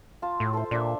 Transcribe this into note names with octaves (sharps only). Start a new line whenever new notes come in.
F4 A5
A2
A4 C5
A#2 D4 E5